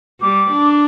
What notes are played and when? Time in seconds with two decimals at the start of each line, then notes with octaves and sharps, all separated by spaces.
0.20 G3 D6
0.51 D4